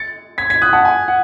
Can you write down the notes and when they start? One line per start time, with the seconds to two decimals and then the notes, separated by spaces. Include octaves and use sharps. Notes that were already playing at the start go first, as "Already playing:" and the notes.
Already playing: A6 C#7
0.38 G#6 B6
0.50 G#6 B6
0.62 D#6 F#6
0.73 F#5 A5
0.85 G#5
1.08 F#5